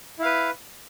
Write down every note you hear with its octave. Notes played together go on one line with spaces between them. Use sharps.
E4 B4 F5